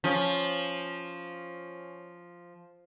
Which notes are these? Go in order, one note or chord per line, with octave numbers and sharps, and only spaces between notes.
F3 C#4